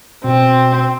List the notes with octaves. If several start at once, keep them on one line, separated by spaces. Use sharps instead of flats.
B2 C4